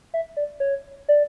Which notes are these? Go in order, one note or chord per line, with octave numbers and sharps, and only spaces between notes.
E5
D5
C#5
D5